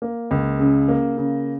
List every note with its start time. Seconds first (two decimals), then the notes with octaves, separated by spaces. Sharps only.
0.02 A#3
0.31 C#2
0.60 C#3
0.88 A#3
1.17 C#3